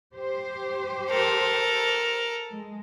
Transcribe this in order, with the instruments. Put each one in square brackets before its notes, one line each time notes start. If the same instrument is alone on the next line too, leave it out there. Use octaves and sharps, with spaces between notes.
[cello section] G4 C5
[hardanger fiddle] A4 A#4
[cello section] G#3